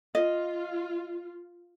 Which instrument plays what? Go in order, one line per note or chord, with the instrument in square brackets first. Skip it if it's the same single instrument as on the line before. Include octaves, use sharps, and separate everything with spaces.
[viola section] F4 [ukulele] D#5